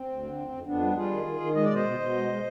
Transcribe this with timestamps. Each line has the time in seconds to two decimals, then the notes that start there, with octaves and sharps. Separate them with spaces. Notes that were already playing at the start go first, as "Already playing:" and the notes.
Already playing: C4
0.08 D2
0.23 D3
0.38 F2
0.52 F2
0.67 F2 B3 D4
0.81 G3
0.96 G3 F4 G#4
1.11 D#3
1.26 D#3
1.40 D#3
1.55 G#3 D#5
1.65 D5
1.70 B2
1.75 C5 D#5
1.85 B2
1.99 B2
2.15 G#3
2.29 G#3